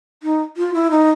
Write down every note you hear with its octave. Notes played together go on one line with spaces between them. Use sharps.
D#4
F4
E4
D#4